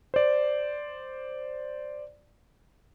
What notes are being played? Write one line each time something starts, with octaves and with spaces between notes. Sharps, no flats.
C5 D5